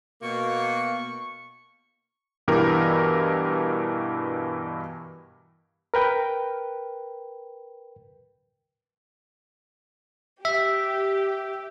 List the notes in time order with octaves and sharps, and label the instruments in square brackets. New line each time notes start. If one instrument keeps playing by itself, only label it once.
[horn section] B2 A#3 [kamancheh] C#6
[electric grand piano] G2 B2 E3 G4 A#4
[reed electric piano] A#4 B4 G5
[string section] G4 [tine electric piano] E5